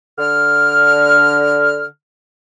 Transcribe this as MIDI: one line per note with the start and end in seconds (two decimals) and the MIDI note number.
0.18 1.84 50
0.18 1.84 89